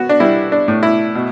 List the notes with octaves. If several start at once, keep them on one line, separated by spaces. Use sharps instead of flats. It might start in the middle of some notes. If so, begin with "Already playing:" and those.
Already playing: B3 F#4
D4
G3 E4
D4
A2
E4
B2